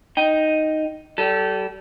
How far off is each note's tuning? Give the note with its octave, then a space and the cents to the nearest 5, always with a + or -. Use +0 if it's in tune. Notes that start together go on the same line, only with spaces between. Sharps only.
D#4 +0 G5 +0
G3 -30 A4 +0